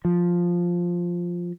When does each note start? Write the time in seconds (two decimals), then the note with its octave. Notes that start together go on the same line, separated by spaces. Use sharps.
0.05 F3